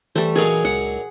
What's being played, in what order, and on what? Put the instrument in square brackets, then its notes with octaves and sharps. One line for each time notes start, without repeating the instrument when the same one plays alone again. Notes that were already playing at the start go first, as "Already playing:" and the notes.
[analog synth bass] E3 [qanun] G3 A3 [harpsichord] C5
[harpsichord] A#2 F#3 D#4 [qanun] G#4 C#6
[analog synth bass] C#2 [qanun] F#5